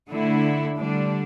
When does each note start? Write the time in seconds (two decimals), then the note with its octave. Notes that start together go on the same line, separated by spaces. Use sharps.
0.11 D3 A3 E4
0.78 D3 G3 D4